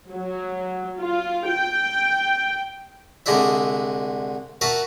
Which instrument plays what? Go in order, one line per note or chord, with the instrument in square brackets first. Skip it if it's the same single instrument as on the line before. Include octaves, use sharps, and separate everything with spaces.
[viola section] F#3
F4
G5
[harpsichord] C2 D3 G#3 D4 E4 E5
F#4 A#4 B4 E5 A5 B5